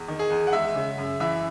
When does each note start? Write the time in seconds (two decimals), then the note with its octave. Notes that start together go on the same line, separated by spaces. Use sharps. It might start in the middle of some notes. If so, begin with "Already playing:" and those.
Already playing: E2
0.08 D#3
0.19 G#4
0.30 E2
0.47 F#5
0.53 G#3 E5
0.75 C#3
0.98 F#2
1.20 E3 E5